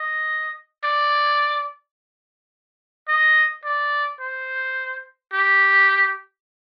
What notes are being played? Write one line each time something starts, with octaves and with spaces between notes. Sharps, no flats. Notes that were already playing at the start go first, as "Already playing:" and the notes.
Already playing: D#5
D5
D#5
D5
C5
G4